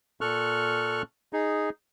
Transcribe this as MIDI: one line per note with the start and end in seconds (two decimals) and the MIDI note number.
0.21 1.02 46
0.21 1.02 69
0.21 1.02 85
0.21 1.02 89
0.21 1.02 90
1.33 1.70 63
1.33 1.70 68